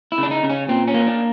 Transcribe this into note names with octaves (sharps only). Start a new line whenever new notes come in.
E4
C#3 D4
D#4
C#3
C#4
A#2 C4
C#4
A#3
D4